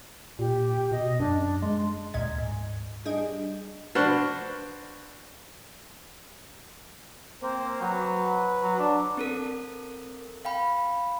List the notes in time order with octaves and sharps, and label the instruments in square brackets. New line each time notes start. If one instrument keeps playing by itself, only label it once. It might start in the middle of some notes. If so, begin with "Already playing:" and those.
[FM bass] A#2 [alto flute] G4
[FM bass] B2 [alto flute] D#5
[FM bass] F#2 [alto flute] D4
[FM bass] G#3 [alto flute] C6
[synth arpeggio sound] D2 A#2 D#5 G#6
G#2
G3 D4 G#4 D#5
[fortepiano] D4 F#4 B4 C5 F6 F#6
[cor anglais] A#3 [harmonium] C4 C5
[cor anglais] F#3 [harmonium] B4
[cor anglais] F#3
D4
[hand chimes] C4 A4 A#4
F5 G5 B5